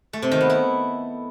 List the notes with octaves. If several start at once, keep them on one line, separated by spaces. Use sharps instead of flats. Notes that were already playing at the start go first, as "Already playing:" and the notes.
A3
C3
D#3
B3
E4